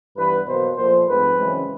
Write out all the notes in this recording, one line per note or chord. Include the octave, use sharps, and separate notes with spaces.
G2 E3 G3 B3 B4
B2 F#3 A#3 C5
A#2 F3 A3 C5
G#2 F3 A3 C4 B4
F#2 C#3 E3 G#3 C4